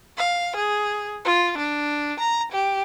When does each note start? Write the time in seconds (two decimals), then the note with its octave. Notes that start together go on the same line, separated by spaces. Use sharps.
0.17 F5
0.56 G#4
1.25 F4
1.58 D4
2.20 A#5
2.51 G4